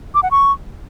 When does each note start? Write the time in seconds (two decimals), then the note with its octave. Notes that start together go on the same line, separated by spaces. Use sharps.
0.15 D6
0.23 F#5
0.31 C#6